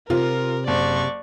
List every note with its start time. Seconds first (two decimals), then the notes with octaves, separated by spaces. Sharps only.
0.10 C3 F4 A#4
0.67 F#1 D5 C#6